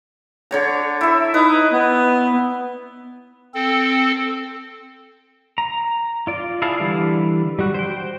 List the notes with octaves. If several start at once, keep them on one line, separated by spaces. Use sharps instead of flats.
D3 C#5 A#5
E4 E5
D#4 B4
B3
C4 A4
A#5
F4 D5
E4 G#4 F5 A5
D3 E3 G3
G3 F#4
C5 G5